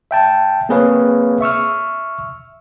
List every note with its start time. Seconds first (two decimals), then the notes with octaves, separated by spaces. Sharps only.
0.11 E5 G5 A5
0.69 A#3 C4 G#4 B4 C#5 F5
1.41 E5 C#6 E6 F6